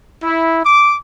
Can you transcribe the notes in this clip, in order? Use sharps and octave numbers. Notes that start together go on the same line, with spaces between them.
E4
D6